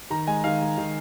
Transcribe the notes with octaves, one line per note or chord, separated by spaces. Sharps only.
D#3 A#5
G#3 G#5
D#3 F5
G#3
D#3